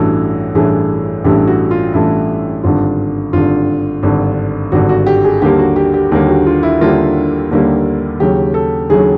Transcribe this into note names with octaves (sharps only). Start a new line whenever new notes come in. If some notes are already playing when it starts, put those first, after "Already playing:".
Already playing: A1 G2 E3 A3 F#4
A1 G2 E3 A3 G#4
A1 G2 E3 A3 G4
F#4
F4
A1 G2 E3 A3 E4
G#1 G2 D3 F4
G#1 G2 D3 F4
G#1 G2 D3
G#1 G2 D3 F#4
F#4
G4
G#4
D#2 D3 G3 A#3 G4
F#4
G4
G4
D#2 D3 G3 A#3 G4
F#4
F4
E4
D#2 D3 G3 A#3 F4
D#2 D3 G3 A#3
D#2 C#3 F#3 G4
A4
D#2 C#3 F#3 G#4